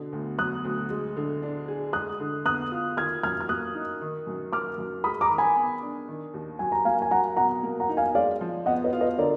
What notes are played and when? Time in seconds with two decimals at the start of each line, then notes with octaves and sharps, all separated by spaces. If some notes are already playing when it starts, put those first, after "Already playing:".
Already playing: B2 D3
0.12 D2
0.38 F#3 D#6 F#6
0.64 D2
0.90 G#3
1.16 D3
1.42 D4
1.68 G#4
1.93 G#3 D#6 F#6
2.20 D3
2.45 B3 D#6 F#6
2.72 F4
2.97 D#3 F6 G#6
3.23 F#2 F6 G#6
3.41 F6
3.49 A#3 D#6 F#6
3.75 D#4
4.01 D#3
4.27 F#2
4.52 A#3 D6 F6
4.78 F#2
5.04 G#3 B5 D#6
5.21 A#5 D6
5.30 D#3
5.38 G#5 B5
5.56 B3
5.82 D4
6.08 D#3
6.34 D#2
6.59 F#3 G#5
6.72 A#5
6.85 A#3 F5 G#5
7.02 G#5
7.11 F#3 F#5 A#5
7.37 B2 F#5 A#5
7.63 A#3
7.80 F#5 A#5
7.89 D#4
7.97 F5 G#5
8.15 G#3 D5 F5
8.41 F3
8.66 B3 D#5 F#5
8.84 B4 D#5
8.93 F4
9.01 B4 D#5
9.18 D3 A#4 D5